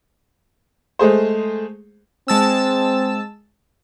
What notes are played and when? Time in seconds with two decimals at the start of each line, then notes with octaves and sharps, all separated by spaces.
0.99 G#3 A3 G#4 C5
2.28 G#3 C4 A5 E6